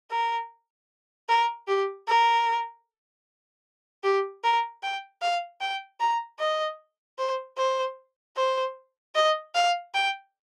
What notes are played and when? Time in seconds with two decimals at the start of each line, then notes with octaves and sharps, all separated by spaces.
0.11 A#4
1.29 A#4
1.68 G4
2.07 A#4
4.03 G4
4.43 A#4
4.83 G5
5.22 F5
5.61 G5
6.00 A#5
6.39 D#5
7.19 C5
7.57 C5
8.36 C5
9.15 D#5
9.55 F5
9.94 G5